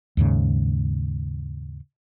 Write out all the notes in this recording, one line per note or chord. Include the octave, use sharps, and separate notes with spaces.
D#2 G#2 C#3